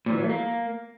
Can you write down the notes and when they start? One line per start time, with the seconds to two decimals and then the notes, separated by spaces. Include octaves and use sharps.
0.06 A#2
0.12 E3
0.18 F#3
0.24 A3
0.29 A#3